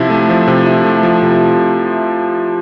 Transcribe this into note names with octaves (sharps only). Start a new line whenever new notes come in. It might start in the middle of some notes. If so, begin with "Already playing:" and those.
Already playing: C3 F3 E4
A3
F3
C3
E4
A3
F3
C3